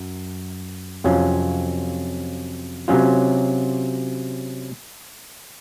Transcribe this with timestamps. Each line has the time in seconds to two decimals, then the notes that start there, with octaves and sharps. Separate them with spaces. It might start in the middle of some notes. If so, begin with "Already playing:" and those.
Already playing: F#2
1.04 F2 C3 F#3 C#4 F4
2.88 C3 F#3 C#4 F4